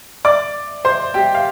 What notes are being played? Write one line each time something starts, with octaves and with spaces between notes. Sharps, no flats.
D5 D6
C5 C6
G4 G5
F5